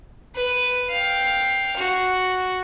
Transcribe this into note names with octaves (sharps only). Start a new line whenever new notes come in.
B4
F5 G5
F#4